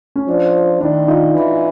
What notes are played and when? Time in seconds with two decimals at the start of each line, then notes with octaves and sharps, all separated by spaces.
0.16 C#4
0.28 F3 D4
0.81 D#3 D4 E4
1.07 D#4 F4
1.34 E3